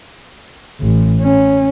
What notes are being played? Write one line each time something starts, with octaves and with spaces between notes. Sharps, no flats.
A1
C#4